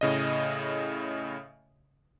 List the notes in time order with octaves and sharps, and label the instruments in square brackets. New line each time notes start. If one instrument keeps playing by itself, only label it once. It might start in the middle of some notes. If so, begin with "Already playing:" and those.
[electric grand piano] A2 C#3 D#5